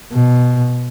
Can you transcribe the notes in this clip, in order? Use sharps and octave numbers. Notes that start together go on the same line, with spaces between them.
B2